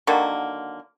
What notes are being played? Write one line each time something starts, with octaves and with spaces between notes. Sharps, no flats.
D3 D#3 F#3 A#3